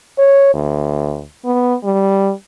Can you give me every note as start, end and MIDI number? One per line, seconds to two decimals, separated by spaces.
0.19 0.52 73
0.54 1.25 38
1.45 1.75 59
1.84 2.32 55